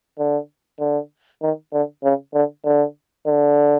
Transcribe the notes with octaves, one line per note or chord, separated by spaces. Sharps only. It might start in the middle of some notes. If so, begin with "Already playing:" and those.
D3
D3
D#3
D3
C#3
D3
D3
D3